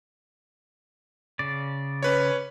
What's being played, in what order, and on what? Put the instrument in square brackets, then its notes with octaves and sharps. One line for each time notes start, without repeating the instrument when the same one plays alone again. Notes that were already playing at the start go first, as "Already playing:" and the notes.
[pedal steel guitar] C#3 D5
[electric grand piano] C#4 B4 C#5